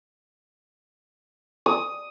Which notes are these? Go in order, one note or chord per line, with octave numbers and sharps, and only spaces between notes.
D#6